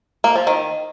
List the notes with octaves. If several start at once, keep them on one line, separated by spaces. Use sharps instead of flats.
A#3
F3
D#3